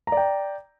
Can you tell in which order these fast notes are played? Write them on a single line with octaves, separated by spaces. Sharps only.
A#5 D5 G5